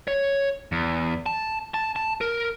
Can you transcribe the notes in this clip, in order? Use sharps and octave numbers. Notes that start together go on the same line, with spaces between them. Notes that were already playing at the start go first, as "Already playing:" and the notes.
C#5
E2
A5
A5
A5
A#4